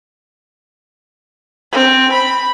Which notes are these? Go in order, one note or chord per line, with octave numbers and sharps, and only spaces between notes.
C4
B5